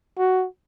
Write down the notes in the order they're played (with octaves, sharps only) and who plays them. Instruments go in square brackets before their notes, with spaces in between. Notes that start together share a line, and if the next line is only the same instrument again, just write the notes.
[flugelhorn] F#4